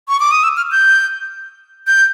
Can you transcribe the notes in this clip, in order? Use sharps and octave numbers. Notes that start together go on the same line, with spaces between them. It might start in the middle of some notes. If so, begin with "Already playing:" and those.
C#6
D6
D#6
E6
F6
G6
G6